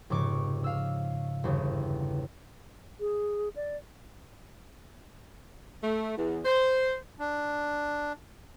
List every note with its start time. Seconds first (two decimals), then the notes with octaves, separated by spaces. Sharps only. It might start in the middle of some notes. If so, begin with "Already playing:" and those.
0.10 F1 G#2 C#3 C#6 D6 D7
0.64 F5 E6
1.44 G1 E2 C#3 G4
3.00 G#4
3.56 D5
5.84 A3
6.17 E2
6.45 C5
7.20 D4